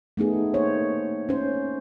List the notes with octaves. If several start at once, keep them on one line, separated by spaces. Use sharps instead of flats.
A3 B3 D#4 G#4
A#3 D#4 C5 C#5
C#4 C5